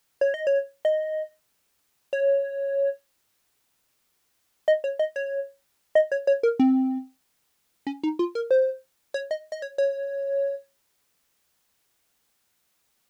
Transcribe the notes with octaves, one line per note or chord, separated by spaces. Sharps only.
C#5
D#5
C#5
D#5
C#5
D#5
C#5
D#5
C#5
D#5
C#5
C#5
A#4
C4
C#4
D#4
F4
A#4
C5
C#5
D#5
D#5
C#5
C#5